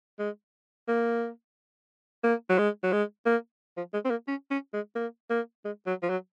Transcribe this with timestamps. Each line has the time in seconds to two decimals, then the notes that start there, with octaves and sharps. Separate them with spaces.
0.19 G#3
0.88 A#3
2.24 A#3
2.49 F#3
2.58 G#3
2.83 F#3
2.92 G#3
3.26 A#3
3.77 F3
3.93 G#3
4.05 C4
4.10 A#3
4.28 C#4
4.51 C#4
4.73 G#3
4.96 A#3
5.30 A#3
5.65 G#3
5.87 F#3
6.03 F3
6.10 F#3